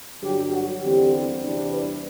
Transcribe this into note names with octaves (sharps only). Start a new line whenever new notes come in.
G2 D3 F#3 G4
F#4
E2 D3 G3 C4 G4
E2 C3 G3 D4
B4